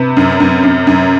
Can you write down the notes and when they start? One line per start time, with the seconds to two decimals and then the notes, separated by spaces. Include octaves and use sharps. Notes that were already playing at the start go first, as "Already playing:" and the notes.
Already playing: C3 B4
0.17 F#2
0.40 F#2
0.63 F#2
0.87 F#2